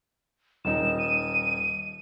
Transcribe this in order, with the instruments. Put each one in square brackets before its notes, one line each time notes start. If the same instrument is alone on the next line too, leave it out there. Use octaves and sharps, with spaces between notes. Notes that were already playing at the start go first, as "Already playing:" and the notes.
[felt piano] D#1 D#4 [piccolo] E7
[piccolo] D#7